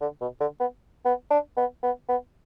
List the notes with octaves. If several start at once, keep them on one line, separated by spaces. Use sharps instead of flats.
D3
B2
D3
B3
B3
D4
B3
B3
B3